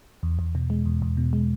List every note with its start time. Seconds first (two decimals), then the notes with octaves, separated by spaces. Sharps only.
0.23 E2
0.39 E2
0.55 B2
0.70 G#3
0.85 E2
1.02 E2
1.17 B2
1.33 G#3